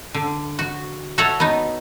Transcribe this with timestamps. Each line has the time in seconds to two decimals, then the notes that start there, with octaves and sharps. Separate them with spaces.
0.14 D3
0.59 F#4
1.18 F#4 A4 C#5 E5 F#5
1.40 B3 D#4